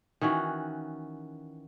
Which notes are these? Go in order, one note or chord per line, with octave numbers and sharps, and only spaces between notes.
D#3 E3 C#4 F#4